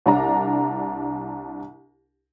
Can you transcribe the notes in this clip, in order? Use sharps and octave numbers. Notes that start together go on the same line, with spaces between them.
C2 D4 A#5